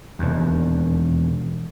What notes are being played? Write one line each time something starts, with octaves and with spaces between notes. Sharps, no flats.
E1 D#2